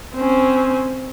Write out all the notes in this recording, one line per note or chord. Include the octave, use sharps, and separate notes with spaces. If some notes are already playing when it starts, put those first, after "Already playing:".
C4 C#4